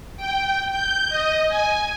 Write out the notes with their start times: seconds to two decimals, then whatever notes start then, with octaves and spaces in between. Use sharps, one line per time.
0.17 G5
0.71 G6
1.09 D#5
1.49 G#5